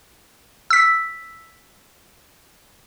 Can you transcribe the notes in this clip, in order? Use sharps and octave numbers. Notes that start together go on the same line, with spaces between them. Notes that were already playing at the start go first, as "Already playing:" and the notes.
E6 B6